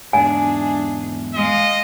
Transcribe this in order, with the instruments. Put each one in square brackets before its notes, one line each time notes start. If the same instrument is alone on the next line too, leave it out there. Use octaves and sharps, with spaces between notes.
[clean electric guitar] E2 G#2 [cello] D4 G#4 [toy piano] G#5
[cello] G#3 F5 [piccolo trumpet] D#5